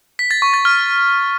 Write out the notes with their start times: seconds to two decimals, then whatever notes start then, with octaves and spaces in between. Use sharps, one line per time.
0.19 B6
0.31 A6
0.42 C#6
0.54 A6
0.65 F6